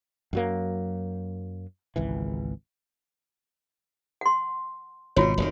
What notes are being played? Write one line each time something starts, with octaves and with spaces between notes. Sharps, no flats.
F#2 F#3 A#3
G#1 C#2 E3
F#5 C6
G#1 B2 F4 F#4 C#5
F1 A#2 D#3